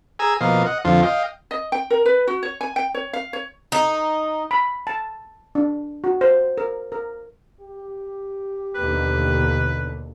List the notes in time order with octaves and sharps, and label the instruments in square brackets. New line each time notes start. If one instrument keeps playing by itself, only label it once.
[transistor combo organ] G#4 G#5 A#5 E6
B2 F3 A#3 D#5 F5
D#5 F#5
F2 D3 F3 F4
D#5 F5 G5
[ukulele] D#5
G5
A#4
B4
F#4
C#5
G#5
G5
C#5
F5
C#5
[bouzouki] D#4
[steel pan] B5
A5
D4
F#4
C5
A#4
A#4
[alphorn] G4
[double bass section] D#2 B2 D3 [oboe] B4